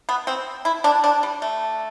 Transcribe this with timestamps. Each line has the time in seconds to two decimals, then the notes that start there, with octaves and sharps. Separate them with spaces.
0.09 B3
0.27 C4
0.65 E4
0.84 D4
1.04 D4
1.23 G3
1.42 A3